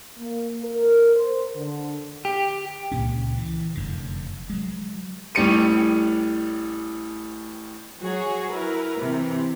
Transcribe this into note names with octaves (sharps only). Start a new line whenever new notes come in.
A#3
A#4
C5
D3
G4
C#2 A#2 C#4
E3
F1 F#2 D3
F#3 G#3
A1 A2 G3 G4 C#7 D#7
F#3 F#4 G#4 C#5
E4 A#4 B4
C3 E3